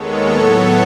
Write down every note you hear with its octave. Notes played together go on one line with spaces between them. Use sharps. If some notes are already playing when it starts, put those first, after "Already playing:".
Already playing: D#2 D#3 G#3 B3 A4 C#5
A2 F#3 B3